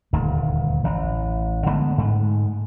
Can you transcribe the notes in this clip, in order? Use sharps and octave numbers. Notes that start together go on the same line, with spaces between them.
D#1 D2 G2
A1 E3
D3 G#3 A3 B3
G#2 G#3 A3